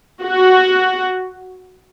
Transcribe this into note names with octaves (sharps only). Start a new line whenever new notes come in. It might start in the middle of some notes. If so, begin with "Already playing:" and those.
F#4